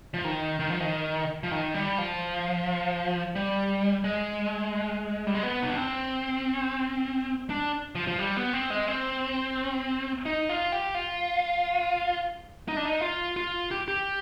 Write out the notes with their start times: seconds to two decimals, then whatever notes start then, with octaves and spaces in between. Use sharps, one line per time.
0.14 F3
0.25 D#3
0.60 D#3
0.70 F3
0.80 D#3
1.43 F3
1.51 D#3
1.74 G3
1.98 F3
3.35 G3
4.04 G#3
5.27 G3
5.34 G#3
5.43 B3
5.62 D#4
5.70 D4
5.77 C4
7.50 D4
7.95 F3
8.08 F3
8.19 G3
8.37 B3
8.53 C4
8.70 G#3
8.88 C4
10.25 D#4
10.49 F4
10.72 G4
10.95 F4
12.68 D#4
12.77 D4
12.85 D#4
13.02 F4
13.36 F4
13.71 G4
13.88 G4